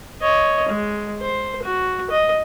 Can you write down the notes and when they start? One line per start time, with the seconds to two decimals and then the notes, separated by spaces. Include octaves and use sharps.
0.22 C#5 D#5
0.69 G#3
1.21 C5
1.63 F#4
2.10 D#5